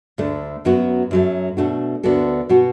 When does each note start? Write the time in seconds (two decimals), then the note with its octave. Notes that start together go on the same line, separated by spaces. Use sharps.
0.18 D2 D3 A3
0.65 F#2 F#3 B3 F#4
1.11 F#2 F#3 A3
1.57 B2 A3 D4 F#4
2.03 D2 D3 B3 F#4 A4
2.49 B2 B3 F#4